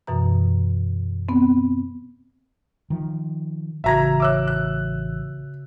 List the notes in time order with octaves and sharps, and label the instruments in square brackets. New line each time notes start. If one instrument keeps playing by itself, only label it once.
[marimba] F#2 B2 E3 A#5
B3 C4
[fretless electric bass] D#3 F3
[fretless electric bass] A1 [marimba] C#3 F#4 G#6 [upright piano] E5 A#5 A#6
[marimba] C#5 E5 [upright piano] D6 E6 F#6
[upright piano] F#6